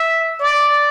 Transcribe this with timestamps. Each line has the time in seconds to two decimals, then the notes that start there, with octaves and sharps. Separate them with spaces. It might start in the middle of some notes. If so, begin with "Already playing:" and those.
Already playing: E5
0.40 D5